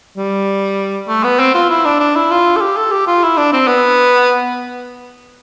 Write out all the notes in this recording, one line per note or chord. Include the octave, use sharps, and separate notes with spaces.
G3
A3
B3
C4
F4
E4
D4
D4
E4
F4
A4
G4
A4
G4
F4
E4
D4
C4
B3